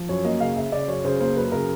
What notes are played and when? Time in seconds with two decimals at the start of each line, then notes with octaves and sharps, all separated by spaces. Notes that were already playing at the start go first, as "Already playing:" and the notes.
Already playing: F3
0.09 F#2 C#5
0.24 A#3 D#5
0.40 C#3 F5
0.56 C#3 E5
0.72 C#3 D5
0.88 F#2 C#5
1.04 C#3 C5
1.20 A#3 C5
1.36 F#2 B4
1.52 C#3 A#4